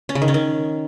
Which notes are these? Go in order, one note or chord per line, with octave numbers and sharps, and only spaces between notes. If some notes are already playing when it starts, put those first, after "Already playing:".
C#4
C#3
D#3
C#4
D#3